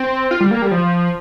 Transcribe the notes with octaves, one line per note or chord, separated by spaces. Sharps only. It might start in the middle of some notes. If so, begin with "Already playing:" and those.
Already playing: C4
F4
G3
A#3
G3
F3